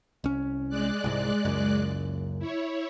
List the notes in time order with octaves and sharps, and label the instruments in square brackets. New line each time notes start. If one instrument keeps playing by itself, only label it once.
[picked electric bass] C2 C#4
[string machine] G#3 D5 F#6
[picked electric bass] C2 G#2
F#1 C#2 F#2
[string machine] E4 C#5